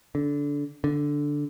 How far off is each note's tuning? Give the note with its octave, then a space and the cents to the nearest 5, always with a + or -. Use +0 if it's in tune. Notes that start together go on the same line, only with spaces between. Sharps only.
D3 -20
D3 -5